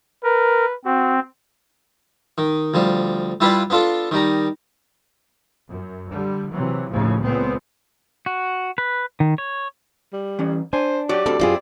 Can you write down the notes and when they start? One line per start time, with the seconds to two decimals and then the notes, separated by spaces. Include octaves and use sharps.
0.24 A#4 B4
0.85 C4 F#4
2.38 D#3
2.74 D2 F3 G3
3.41 G3 E4 F4 G4 B4 D5
3.70 B3 D4 F4 A4
4.11 D#3 G3 A#5
5.69 F#2
6.12 D3 G3
6.51 C3 E3 F#3
6.90 D#2 A2 C#3 F3
7.21 C#2 A#2 B3 C4
8.26 F#4
8.78 B4
9.20 D#3
9.38 C#5
10.13 G3
10.39 E3 C#4
10.73 D4 C5 G#5
11.09 F#3 F#4 G4 D5
11.26 D2 G2 C4 A4
11.39 F#2 C3 C4 E4 F4 G#4